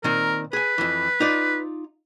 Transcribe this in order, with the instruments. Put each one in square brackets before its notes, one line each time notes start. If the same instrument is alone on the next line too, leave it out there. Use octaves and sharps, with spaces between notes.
[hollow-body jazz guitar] A#2 D#3 C4 [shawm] A#4
[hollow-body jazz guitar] G#4 G#5 [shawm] B4
[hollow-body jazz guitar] F2 E3
D#4 F4 D5